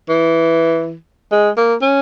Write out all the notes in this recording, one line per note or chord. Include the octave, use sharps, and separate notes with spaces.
E3
G#3
A#3
C#4